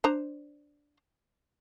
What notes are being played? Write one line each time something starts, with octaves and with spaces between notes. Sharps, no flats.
D4 C5 A#5